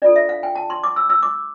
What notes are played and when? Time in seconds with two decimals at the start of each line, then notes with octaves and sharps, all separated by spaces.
0.02 D4 F4 A4 D5
0.16 E5
0.29 F5
0.43 G5
0.55 A5
0.70 C6
0.83 D6
0.96 E6
1.10 E6
1.23 D6